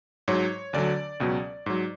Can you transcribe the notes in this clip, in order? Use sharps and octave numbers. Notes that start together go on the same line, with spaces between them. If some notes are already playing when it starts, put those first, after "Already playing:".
G#2 F#3 C#5
D2 D3 F#3 D5
C#2 B2 F#3
G#2 F#3